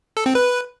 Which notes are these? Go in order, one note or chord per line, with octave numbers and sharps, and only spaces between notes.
A4
C4
B4